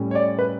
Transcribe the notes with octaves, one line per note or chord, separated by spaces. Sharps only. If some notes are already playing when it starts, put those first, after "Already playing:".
Already playing: A2 G3 C#4
C#5
D5
B4